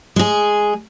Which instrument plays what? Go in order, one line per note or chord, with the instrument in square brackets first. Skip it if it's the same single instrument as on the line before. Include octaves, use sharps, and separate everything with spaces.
[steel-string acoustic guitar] G#3 G#4